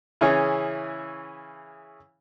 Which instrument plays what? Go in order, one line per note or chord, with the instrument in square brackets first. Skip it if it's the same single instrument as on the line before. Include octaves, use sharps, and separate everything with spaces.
[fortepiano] C#3 E3 C#4 E4 G#4 C#5